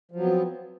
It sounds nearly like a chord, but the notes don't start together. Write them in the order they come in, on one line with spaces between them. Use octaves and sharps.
F3 F#3 B3 C4